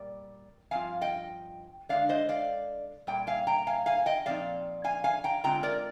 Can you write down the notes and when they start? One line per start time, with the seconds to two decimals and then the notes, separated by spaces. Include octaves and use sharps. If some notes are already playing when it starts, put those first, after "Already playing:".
Already playing: A#2 G3 D5
0.71 G2 F3 C4 F4 F5 G#5
1.01 D#5 G5
1.89 D3 G#3 D4 D5 F5
2.09 C5 D#5
2.29 D5 F5
3.07 A#2 G3 G5
3.27 F5 G#5
3.47 G5 A#5
3.67 F5 G#5
3.86 F5 G#5
4.06 D#5 G5
4.26 A#2 F3 C4 D#4 D5 F5
4.84 F5 G#5
5.04 F5 G#5
5.24 G5 A#5
5.44 D3 G#3 C4 F4 G5 A#5
5.63 A#4 D5